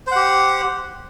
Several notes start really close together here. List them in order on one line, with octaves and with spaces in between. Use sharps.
C5 F#5 G4